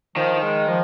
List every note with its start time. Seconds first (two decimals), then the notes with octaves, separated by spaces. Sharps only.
0.16 D#3 F3
0.42 G#3
0.68 F3